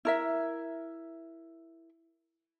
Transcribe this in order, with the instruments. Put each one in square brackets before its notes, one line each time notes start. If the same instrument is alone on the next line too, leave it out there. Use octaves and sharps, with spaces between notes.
[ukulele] E4 A#4 E5